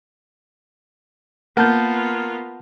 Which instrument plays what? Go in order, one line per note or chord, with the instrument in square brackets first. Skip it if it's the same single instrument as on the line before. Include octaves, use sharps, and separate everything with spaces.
[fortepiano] A#3 [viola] B3 F4 [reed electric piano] F#5 A5 G6